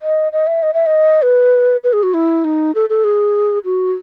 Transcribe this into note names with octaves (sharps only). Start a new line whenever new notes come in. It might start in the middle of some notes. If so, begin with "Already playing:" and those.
D#5
D#5
E5
D#5
E5
D#5
B4
B4
G#4
F#4
E4
D#4
A4
A4
G#4
F#4